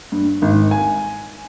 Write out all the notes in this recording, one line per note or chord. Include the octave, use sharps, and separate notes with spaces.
G2
G#1
G#5